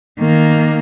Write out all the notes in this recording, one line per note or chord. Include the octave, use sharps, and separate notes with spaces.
D#3 A#3